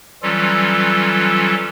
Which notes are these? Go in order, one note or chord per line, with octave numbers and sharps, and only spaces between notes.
E3 F#3 G3 C#4 F4 A4